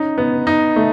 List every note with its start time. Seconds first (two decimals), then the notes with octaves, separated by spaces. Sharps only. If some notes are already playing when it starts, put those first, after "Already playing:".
Already playing: C#4 D#4
0.18 B3
0.47 D#4
0.76 A3